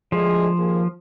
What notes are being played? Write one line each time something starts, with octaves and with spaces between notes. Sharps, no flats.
D2 F3 G#3 G#4
D#2 A#3 G#4